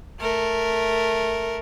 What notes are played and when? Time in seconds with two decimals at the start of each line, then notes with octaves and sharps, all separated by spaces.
0.20 A3 A#4